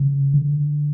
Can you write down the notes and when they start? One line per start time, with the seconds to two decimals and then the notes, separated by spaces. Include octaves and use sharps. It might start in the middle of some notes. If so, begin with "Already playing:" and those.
Already playing: C#3
0.34 D3